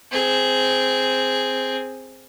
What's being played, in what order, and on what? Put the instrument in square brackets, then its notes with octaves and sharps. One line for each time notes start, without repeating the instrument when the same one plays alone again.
[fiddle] C4 G#4